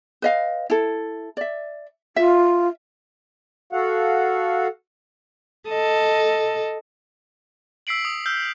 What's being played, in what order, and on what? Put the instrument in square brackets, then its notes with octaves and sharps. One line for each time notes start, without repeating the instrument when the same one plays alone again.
[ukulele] B4 D#5 F5
E4 A4
D5 E5
[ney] F4 [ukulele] E5
[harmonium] F#4 A4 F5 F#5
[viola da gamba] A4 D#5
[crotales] E6 B6 C7 D7 F#7
D#6
E6 F6 G6